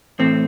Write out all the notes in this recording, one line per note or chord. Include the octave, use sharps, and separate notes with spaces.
A2 E3 A3 C4